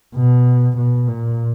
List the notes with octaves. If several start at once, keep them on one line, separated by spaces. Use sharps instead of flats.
B2
B2
A#2